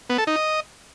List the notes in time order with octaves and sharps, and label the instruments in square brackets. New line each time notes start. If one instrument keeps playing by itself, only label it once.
[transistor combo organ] B3
A4
D#4
D#5